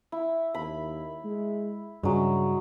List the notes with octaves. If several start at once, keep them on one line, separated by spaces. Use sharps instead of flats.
E4
D#2 B5
G#3
G2 C#3 F#3 G#3